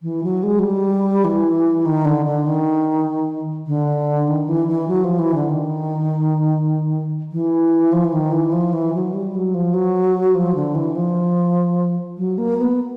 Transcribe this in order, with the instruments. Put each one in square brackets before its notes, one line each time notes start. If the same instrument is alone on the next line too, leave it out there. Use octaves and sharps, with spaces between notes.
[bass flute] E3
F#3
G#3
F#3
G3
E3
D#3
D3
D3
D#3
D3
D#3
E3
E3
F#3
F3
E3
D3
D#3
E3
F3
E3
D#3
E3
F3
E3
F#3
G3
F#3
F3
F#3
F3
D3
E3
F3
F#3
A#3
B3